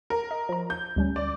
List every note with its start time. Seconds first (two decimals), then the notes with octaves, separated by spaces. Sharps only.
0.10 A#4
0.31 D#5
0.49 F3 A#5
0.70 G6
0.96 D2 G3 C#4
1.16 D5